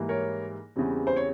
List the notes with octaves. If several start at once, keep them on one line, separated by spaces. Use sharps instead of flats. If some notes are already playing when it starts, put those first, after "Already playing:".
Already playing: G#2 E3 G3 A#3 E4
A#4 C#5
E2 C#3 E3 G3 C4
C5
C#5